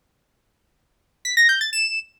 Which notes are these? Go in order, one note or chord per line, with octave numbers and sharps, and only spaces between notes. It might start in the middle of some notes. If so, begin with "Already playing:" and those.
B6
A#6
G6
A6
E7